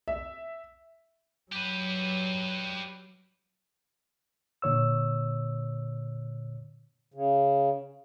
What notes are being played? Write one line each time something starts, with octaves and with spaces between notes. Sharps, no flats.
E5
F#3 G4 B4
A#2 D3 C#5 E6
C#3